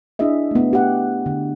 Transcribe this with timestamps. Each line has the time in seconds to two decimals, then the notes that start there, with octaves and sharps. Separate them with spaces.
0.19 D4 E4 G#4 D#5 E5
0.51 A3 B3
0.73 G4 F#5
1.26 D3